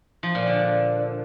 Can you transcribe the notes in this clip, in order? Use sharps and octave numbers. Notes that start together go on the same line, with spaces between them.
F3
A#2
D3